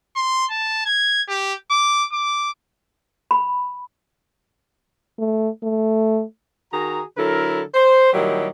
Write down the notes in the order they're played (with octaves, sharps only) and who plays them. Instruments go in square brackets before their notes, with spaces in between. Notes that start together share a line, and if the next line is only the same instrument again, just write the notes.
[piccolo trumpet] C6
A5
G#6
G4
D6
D6
[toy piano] B5
[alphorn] A3
A3
[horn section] D#3 F#4 G#4 A#5
D3 F#3 E4 A4 A#4
C5
A#2 D#3 F#3 G3 E4 G4